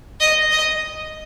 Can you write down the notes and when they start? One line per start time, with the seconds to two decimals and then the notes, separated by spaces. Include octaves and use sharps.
0.20 D#5
0.51 D#5